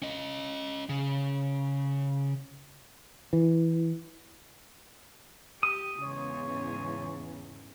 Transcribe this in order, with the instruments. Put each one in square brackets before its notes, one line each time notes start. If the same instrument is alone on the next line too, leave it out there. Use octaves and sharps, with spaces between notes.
[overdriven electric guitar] C#4 D#5
C#3
[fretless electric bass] E3
[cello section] G4 [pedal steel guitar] D#6
[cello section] E2 G#2 C#3 [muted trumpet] C#5